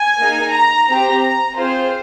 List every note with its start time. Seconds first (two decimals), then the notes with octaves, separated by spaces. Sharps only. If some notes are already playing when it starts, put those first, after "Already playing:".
Already playing: G#5
0.18 A#3 D#4 G#4
0.52 A#5
0.87 C4 G4 A#5
1.23 A#5
1.56 C4 F4 G#4 C5